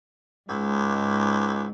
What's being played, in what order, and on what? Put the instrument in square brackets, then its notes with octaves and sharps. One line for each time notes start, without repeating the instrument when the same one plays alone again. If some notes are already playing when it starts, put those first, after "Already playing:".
[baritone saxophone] C#2 [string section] G#2